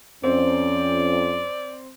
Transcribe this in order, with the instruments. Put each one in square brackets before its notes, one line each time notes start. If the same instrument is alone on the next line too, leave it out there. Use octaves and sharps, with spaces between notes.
[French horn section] F2 C#4 [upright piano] C4 [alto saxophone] D5